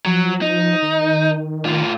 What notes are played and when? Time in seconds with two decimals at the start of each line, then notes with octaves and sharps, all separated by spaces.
0.05 F3 F#3
0.42 D#4
0.82 D#3
1.65 A2 F4